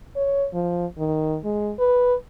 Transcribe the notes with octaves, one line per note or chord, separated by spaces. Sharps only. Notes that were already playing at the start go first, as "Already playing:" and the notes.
C#5
F3
D#3
G#3
B4